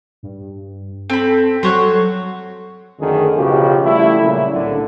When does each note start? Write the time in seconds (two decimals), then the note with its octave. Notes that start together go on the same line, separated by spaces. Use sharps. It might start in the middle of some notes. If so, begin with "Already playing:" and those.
0.23 G2
1.10 C4 A4 B5
1.63 F#3 C5 C#5 F#5
3.00 F#2 D3 D#3 A3 G#4
3.36 B1 C#3 F3 F#4 G4
3.85 G3 A3 E4
4.22 A#2 C#3 F#3
4.52 C2 A2 D3